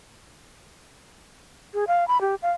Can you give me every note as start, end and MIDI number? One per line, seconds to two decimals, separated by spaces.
1.74 1.84 68
1.87 2.07 77
2.08 2.20 83
2.21 2.35 67
2.42 2.51 77